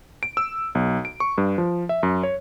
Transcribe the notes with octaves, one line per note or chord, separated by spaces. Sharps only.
D7
E6
B1
D7
C#6
G2
F3
E5
F#2
C#5